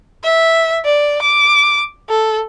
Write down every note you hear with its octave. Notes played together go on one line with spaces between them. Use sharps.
E5
D5
D6
A4